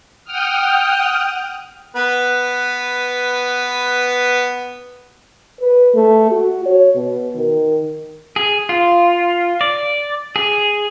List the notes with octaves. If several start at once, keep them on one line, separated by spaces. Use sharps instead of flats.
F#5 G5 D#6 F6
B3 B4
B4
A3
F#4
C#5
B2
D#3
G#4
F4
D5
G#4